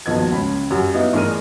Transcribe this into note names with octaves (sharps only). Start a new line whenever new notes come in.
D#1 B1 F3 B3 D#5 G#6
C#2 C#3 B5
F#2 G3 F#4
B3 D#4 E4 F5
A1 D4 G#4 A#4 F6 D#7